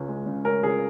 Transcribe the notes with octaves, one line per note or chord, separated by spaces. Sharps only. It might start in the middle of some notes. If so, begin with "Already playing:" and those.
Already playing: C#2 C#4
G#3
C#3
C#4 A#4
C#2 G#4